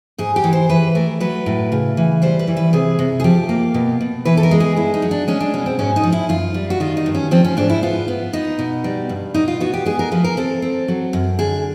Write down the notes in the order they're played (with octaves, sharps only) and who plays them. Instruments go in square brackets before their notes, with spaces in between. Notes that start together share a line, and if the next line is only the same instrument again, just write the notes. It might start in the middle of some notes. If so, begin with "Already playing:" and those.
[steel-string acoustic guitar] G#2 G#4
G4
E3
C5
E3 B4
A3 A#4
F#3 B4
A2
C#3
E3
G3 C5
B4
E3
B4
C3 G#4
C3
G#4
F3 G4
A#3
B2
B2
E3 B4
A4
A#4
G#3
G#4
G2 E4
D#4
F#3
D4
G#3 C#4
D4
B2 C#4
C4
G#2 C#4
D#4
F3
E4
F#2 F4
G3
F#4
D#3 F4
D#4
G2
C#4
F3 C4
C#4
G#2 D4
E4
B3 F4
B3
B3 D#4
B2
G3
G2
B2 D#4
F4
B3 F#4
G4
G#3 G#4
A#4
F3 B4
A#4
C4 A4
C4
F#3
F#2
D3 G#4